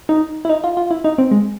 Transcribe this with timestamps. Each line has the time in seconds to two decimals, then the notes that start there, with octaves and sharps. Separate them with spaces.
0.09 D#4
0.45 E4
0.49 D#4
0.64 F4
0.77 F4
0.91 E4
1.04 D#4
1.18 C4
1.31 G#3